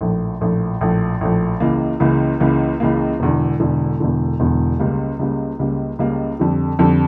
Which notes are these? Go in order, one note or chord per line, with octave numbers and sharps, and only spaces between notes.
A#1 A2 F3
A#1 A2 F3
A#1 A2 F3
A#1 A2 F3
C#2 C#3 E3 A#3
C#2 C#3 E3 A#3
C#2 C#3 E3 A#3
C#2 C#3 E3 A#3
E1 E2 D3
E1 E2 D3
E1 E2 D3
E1 E2 D3
C#2 C#3 G3 A#3
C#2 C#3 G3 A#3
C#2 C#3 G3 A#3
C#2 C#3 G3 A#3
F2 D3 G3
F2 D3 G3